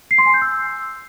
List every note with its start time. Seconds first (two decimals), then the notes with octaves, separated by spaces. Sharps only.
0.11 C7
0.18 C6
0.26 G#5
0.34 G6
0.42 E6